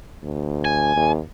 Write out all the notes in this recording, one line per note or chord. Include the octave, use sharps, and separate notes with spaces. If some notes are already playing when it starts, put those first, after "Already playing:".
D2
G#5
D#2